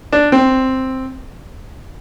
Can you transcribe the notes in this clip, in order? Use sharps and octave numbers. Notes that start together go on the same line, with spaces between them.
D4
C4